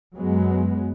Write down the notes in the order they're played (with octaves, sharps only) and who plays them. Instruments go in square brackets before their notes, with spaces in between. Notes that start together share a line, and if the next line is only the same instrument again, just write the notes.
[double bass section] F#2 F#3 G#3 B3